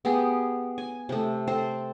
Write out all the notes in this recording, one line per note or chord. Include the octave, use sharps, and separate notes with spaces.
B3 G4 G#4
G#5
C3 A3
C4 A4 C5